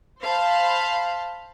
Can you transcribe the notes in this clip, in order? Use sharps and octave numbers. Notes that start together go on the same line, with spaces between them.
C5 F5 A5 B5